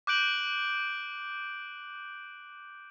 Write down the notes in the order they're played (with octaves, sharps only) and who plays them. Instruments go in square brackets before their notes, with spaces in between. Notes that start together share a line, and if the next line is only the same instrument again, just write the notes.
[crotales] D6 F#6 G6 D7 F#7